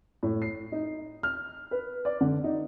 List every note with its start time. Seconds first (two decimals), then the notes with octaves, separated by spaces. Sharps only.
0.23 A2
0.42 C7
0.72 D#4
1.23 F6
1.71 B4
2.05 D5
2.21 D3
2.44 D#4